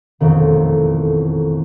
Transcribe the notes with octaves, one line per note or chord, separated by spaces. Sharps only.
E1 A1 F2 D#3